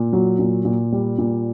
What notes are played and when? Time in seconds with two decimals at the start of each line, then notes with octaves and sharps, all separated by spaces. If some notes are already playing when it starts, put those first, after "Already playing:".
Already playing: A#2
0.13 F#3
0.39 A#2
0.65 A#2
0.92 G3
1.18 A#2